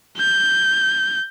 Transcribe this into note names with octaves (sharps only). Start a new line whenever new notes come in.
G6